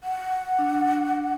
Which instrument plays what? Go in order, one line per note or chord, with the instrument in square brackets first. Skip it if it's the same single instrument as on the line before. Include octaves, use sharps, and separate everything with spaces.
[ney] F#5
[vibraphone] D4